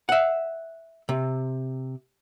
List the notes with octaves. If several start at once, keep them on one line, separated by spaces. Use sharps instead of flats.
E5 F#5
C3